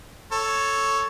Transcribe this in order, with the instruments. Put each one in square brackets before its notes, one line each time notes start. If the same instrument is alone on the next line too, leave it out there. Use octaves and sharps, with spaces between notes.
[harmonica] A4 C#5